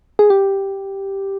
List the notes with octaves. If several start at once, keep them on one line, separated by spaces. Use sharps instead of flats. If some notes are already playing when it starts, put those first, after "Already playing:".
G#4
G4